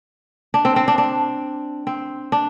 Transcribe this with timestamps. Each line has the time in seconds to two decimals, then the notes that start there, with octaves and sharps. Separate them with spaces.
0.54 D4
0.65 C4
0.76 C4
0.88 D4
0.98 D4
1.87 C4
2.32 D4